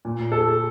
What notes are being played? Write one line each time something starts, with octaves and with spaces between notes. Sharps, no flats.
A#2
A4